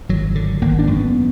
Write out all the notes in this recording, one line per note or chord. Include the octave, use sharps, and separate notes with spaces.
G#1 F#3
D3
G#1 A#3
D4
F#2
B3